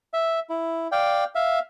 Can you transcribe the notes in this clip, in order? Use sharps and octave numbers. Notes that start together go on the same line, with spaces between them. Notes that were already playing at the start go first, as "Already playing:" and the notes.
E5
E4
D5 F5 G5
E5 F5